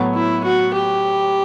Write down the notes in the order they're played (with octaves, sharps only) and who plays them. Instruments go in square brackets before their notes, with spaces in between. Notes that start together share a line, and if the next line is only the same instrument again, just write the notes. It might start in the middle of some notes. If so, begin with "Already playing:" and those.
Already playing: [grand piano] A2 F#3 B3
[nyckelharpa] E4
F#4
G4